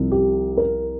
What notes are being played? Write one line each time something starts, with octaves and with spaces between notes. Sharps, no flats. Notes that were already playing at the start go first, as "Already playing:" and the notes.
Already playing: C2 C3 F3
G4
A#4